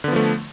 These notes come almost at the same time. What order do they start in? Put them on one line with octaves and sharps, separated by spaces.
D3 B3 F3 A3